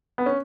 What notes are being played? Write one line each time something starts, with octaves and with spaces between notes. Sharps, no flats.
B3
C#4